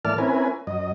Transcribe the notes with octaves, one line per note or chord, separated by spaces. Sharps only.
A2 E3 A#3 D5 A5 F6
C4 C#4 E4 A#4 B4 G#5
F#2 D#5